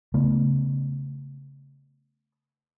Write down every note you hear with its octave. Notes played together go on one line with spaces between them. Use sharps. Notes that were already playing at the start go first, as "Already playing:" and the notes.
C#3 A3 B3